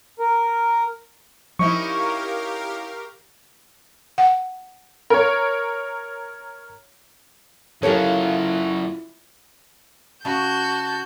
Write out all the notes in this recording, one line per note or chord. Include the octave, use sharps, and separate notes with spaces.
A#4
F3 C#4 D#4 E4 G4 A#4 F5 C#6
F#5
A#4 C#5
C#3 F#3 E4 F4 G4 A4 A#4 C#5
C#3 F#4 A5 G6